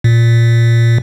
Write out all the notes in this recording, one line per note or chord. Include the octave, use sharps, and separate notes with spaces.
A#2